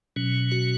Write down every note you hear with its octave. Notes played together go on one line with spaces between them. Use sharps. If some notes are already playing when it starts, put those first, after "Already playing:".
B2 F#3 C#4
F#4